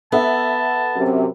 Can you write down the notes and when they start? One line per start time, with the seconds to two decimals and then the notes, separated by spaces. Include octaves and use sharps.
0.12 B3 A4 E5 F#5 A5
0.96 F#2 C3